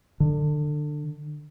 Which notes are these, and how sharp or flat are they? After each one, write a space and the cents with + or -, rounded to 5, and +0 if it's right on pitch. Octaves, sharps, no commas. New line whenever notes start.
D3 +25